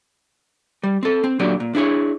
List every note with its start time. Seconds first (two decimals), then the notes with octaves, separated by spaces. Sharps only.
0.83 G3
1.03 C4 A4
1.24 C4
1.39 A#2 D3 F#3 G4 D5
1.60 A#2
1.75 D4 E4 G#4 C#5